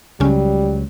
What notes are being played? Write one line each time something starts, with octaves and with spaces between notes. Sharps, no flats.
C#2 C#3 F#3 G3 C#4